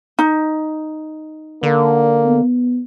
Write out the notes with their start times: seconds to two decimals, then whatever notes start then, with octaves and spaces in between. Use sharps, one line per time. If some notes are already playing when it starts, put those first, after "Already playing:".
0.19 D#4
1.63 D3 A#3
2.26 B3